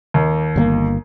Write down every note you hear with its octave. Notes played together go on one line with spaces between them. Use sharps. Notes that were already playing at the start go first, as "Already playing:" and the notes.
D#2
G1 C#3 A#3